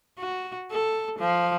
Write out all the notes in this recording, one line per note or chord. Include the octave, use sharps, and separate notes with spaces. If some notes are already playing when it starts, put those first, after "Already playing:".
F#4
A4
F3